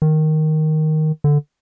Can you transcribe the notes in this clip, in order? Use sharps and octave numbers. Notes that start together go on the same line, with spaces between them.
D#3
D3